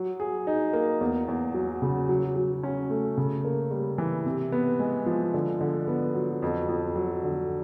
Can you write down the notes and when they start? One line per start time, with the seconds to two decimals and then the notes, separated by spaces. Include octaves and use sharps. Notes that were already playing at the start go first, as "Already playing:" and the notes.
Already playing: F#3
0.20 G#4
0.47 D#4
0.73 A#3
1.01 E2
1.28 E2
1.54 F#3
1.82 C#3
2.09 F#3
2.36 F#3
2.63 C#4
2.90 A3
3.17 C#3
3.45 A#3
3.71 G3
3.98 E3
4.25 C3
4.52 B3
4.79 G#3
5.06 F3
5.34 D3
5.61 D3
5.88 B3
6.14 F#3
6.42 F2
6.69 F2
6.96 F#3
7.24 D3